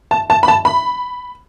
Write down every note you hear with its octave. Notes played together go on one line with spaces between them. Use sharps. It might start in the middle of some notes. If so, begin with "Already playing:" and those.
A5
A5
B5
A5
B5